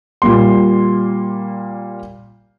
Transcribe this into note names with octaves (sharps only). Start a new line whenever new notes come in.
A#2 G3 A#3 C6